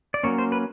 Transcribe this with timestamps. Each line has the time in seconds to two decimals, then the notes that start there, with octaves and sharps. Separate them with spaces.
0.14 D5
0.23 F#3 A#3 C#4 C#5
0.38 C5
0.52 B4